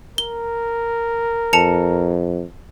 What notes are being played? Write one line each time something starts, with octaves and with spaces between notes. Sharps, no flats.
A#4 G7
F2 A5 C#7 F7